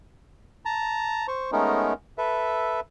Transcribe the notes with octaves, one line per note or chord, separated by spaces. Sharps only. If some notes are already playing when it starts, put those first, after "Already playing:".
A5 A#5
C5 C#6
G#3 A3 B3 C#4 D#4 A#4
A4 B4 E5